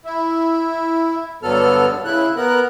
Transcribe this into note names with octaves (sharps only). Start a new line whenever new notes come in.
E4
G2 D3 F#3 B3 A4 F6
C#3 E4 F#6
B3 A#4 F#6